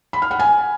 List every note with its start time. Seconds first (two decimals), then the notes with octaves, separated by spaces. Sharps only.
0.13 B5
0.22 F6
0.31 F#5
0.39 G#5